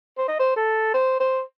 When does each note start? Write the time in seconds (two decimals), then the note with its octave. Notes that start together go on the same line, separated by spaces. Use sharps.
0.18 C5
0.28 D#5
0.39 C5
0.56 A4
0.94 C5
1.20 C5